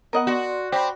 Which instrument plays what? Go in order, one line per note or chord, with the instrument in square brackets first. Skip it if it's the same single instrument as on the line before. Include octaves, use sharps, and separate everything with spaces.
[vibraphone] B3 [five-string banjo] A#4 D#5 F#5
[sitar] F#4 [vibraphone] D5 C6
[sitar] C4 [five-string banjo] G4 B5